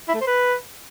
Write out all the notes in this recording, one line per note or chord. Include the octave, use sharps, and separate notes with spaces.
E4
A3
C5
B4